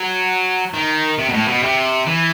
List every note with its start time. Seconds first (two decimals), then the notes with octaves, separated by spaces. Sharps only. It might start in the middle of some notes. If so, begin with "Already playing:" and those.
Already playing: F#3
0.74 D#3
1.18 C3
1.29 B2
1.33 A2
1.48 B2
1.63 C3
2.07 E3